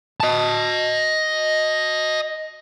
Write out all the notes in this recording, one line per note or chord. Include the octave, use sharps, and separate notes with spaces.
D#5 A5